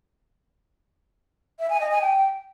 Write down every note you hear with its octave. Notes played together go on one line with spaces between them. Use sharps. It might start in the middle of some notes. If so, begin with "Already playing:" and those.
E5
G#5
D#5
G#5
G5